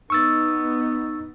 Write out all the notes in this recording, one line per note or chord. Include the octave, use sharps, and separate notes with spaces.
B3 D#4 C#6 E6 A6